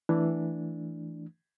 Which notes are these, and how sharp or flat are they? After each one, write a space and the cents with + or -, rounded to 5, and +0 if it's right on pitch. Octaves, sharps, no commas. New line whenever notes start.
E3 +0 A3 +0 D4 +0